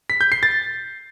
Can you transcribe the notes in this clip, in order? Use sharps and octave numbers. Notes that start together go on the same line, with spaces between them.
B6
G6
C7
A6